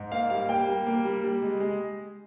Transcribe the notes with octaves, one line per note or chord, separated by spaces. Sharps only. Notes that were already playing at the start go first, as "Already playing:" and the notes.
Already playing: G#2
A#3 F5
G3 F5
A#3 G5
G3
A#3
G3
G3
G#3
G#3